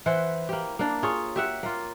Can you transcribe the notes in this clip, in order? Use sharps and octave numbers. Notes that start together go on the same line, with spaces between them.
E3 E4 C5 F#5
A#3 G4
A#3 D4
F4 G#4 C#5
G4 E5 F#5
A#3 F4